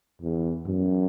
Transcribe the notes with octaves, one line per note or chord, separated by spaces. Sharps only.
E2
F#2